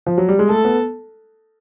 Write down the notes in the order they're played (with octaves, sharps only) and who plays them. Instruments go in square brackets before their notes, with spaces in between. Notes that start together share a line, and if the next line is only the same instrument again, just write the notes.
[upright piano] F3
F#3
G3
G#3
[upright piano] A3 [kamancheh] A4
[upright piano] B3